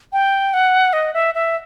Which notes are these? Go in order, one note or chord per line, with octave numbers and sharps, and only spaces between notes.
G5
F#5
D#5
E5
E5